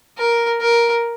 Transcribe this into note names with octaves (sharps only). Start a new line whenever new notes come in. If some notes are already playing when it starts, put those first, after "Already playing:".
A#4
A#4